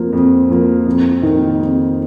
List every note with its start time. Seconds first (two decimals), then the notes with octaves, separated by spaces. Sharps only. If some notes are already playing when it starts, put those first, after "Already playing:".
Already playing: F2 F3 A#3
0.13 F2
0.50 F3 A#3
0.86 F2
1.22 D#3 A#3 D#4
1.60 F2